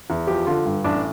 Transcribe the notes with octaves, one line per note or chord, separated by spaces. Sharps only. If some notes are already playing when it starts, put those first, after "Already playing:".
E2
F3 G4
D3 F4
G2
A1 D4